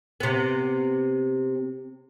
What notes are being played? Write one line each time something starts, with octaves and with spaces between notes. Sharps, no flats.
C3 B3